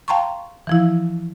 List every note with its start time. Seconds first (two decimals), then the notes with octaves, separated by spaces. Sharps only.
0.08 F5 G5 A5 A#5 C6 C#6
0.67 E3 F3 E4